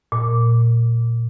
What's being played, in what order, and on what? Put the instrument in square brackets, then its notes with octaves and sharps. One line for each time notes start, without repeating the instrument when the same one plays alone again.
[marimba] A#2